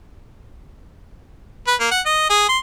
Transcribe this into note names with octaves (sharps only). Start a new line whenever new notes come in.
B4
A#3
F#5
D#5
G#4
C6